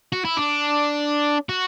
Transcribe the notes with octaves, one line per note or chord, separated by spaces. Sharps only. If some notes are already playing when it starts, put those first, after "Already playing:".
F#4
E4
D4
F#4